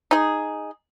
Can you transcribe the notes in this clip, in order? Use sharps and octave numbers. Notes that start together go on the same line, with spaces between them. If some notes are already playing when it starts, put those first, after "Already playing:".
D#4 G#4